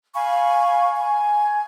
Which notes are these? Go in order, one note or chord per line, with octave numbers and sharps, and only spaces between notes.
F5 G#5 B5 C#6
G#5